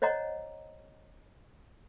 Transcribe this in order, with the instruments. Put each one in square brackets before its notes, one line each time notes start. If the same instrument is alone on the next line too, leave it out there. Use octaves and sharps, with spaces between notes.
[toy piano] C5 C#5 D#5 F#5 A#5